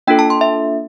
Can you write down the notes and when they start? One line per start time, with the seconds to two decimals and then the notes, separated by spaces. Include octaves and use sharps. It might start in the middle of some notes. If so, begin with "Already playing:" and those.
0.07 A#3 D4 F4 A4 G5
0.19 A5
0.30 C6
0.41 E5